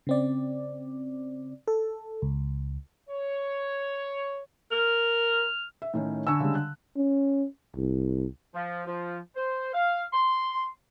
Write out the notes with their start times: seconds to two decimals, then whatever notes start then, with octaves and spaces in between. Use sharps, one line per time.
0.07 C#3 C4 D5
1.68 A4
2.22 C#2
3.09 C#5
4.72 A#4 F6
5.82 E5
5.94 A2 D#3 C#4
6.27 D3 G#5 C#6 E6
6.40 C#3 G3 G#3
6.55 F#6
6.96 C#4
7.76 C2
8.54 F3
8.87 F3
9.36 C5
9.73 F5
10.13 C6